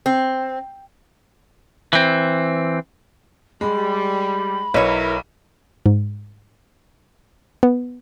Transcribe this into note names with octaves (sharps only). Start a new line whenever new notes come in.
C4
E3 C4
G3 G#3 B5
B1 E4 A#4 B4 C#5
G#2
B3